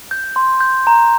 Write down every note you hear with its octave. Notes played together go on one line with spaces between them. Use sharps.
G6
C6
G6
A#5